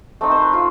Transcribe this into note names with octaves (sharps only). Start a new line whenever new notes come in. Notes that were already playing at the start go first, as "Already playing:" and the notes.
A3 C4 D#4
C5
B4
F4